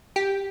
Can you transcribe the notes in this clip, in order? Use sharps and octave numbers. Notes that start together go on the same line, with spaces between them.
G4